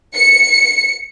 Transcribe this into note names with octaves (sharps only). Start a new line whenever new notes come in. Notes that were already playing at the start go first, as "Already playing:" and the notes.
C#7